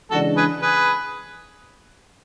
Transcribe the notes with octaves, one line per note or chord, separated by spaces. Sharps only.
C#3 E3 G#3 D4 F#4 A4
G#4 B4
G#4 B4